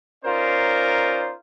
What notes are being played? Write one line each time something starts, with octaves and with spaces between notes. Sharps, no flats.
C#4 D#4 F4 A#4 C5 D5